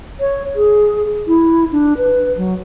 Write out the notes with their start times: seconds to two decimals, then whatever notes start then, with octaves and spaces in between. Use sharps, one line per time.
0.20 C#5
0.56 G#4
1.27 E4
1.72 D4
1.98 B4
2.37 F#3